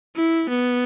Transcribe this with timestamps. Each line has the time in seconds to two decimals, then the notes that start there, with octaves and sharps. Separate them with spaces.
0.16 E4
0.50 B3